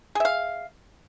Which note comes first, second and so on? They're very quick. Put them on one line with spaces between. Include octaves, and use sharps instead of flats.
G#4 E5 F5